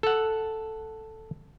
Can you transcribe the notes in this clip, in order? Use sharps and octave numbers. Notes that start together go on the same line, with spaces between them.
A4 F#5